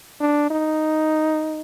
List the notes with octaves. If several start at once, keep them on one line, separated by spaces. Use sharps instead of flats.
D4
D#4